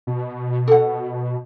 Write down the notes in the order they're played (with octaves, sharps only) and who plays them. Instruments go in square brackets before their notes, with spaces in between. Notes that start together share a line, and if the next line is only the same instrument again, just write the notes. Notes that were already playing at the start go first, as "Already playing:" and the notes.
[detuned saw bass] B2
[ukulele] A4 F#5